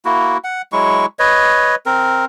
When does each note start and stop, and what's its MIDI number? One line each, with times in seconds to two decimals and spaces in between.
0.05 0.37 58
0.05 0.37 64
0.05 0.37 66
0.44 0.62 78
0.72 1.06 54
0.72 1.06 56
0.72 1.06 64
0.72 1.06 85
1.19 1.75 71
1.19 1.75 73
1.19 1.75 75
1.86 2.25 60
1.86 2.25 70